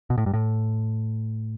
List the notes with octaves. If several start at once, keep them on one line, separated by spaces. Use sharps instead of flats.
B2
A2
G2
A2